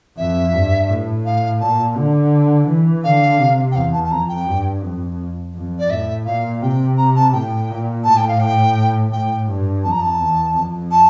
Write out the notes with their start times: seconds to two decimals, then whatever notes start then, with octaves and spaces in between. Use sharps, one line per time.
0.18 F2 E5
0.53 G2
0.89 A2
1.25 F5
1.61 A#2 A5
1.96 D3
2.68 E3
3.04 D3 F5
3.39 C3
3.72 G5
3.75 E2 F5
3.93 A5
4.04 A5
4.10 F2 A#5
4.29 G5
4.47 G2
4.83 F2
5.54 F2
5.79 D5
5.90 A2 E5
6.26 A#2 F5
6.62 C3 G5
6.97 A#5
7.16 A5
7.33 A2 G5
7.70 A#2
8.04 A2 A5
8.17 G5
8.28 F5
8.40 G5
9.12 A2 G5
9.47 G2
9.84 F2 A5
9.92 A#5
10.01 A5
10.19 E2
10.55 F2
10.91 A5